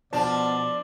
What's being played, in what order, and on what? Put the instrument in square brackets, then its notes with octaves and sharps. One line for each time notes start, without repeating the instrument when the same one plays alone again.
[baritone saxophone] B2 [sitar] F3 D4 [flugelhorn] D5 [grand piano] A5